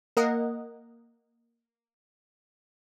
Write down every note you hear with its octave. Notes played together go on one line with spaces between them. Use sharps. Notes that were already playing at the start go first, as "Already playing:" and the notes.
A#3 A#4 D#5 F#5